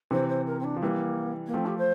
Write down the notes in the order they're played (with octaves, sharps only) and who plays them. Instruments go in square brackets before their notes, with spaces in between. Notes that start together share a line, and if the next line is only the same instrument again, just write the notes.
[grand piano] C3 E3 [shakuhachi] C5
[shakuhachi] C5
A#4
C4
D4
[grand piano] F3
[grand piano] E3 G3 [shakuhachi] A#3
[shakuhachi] A#3
[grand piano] F3 A3 [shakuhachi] C4
[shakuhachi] G4
C5